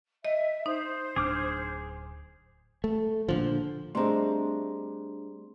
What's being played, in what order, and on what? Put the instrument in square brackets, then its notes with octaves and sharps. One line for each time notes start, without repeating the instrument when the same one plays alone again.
[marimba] D#5 [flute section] E5
[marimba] D#4 [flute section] C5
[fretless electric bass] D1 D4 [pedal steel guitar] G#4 D6 F6
[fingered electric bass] A3
A#2 D3 F3
[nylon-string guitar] G3 C4 [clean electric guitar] A3 D4 D#5 [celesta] G#4 A#5 C6